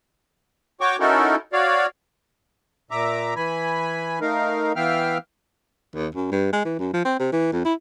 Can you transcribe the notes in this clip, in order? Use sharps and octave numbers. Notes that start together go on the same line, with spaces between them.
F#4 C#5 G5 C#6 D6
C#4 D#4 E4 F#4 A4 A#4
F#4 C#5 D5 F5
A#2 E5 A#5 D6
E3 G#5 B5
A3 D#4 A#4 F5
E3 B3 E5 F5 G5 F6
D#2
F#2
G2
G#3
E3
F#2
F3
C4
C3
E3
F2
E4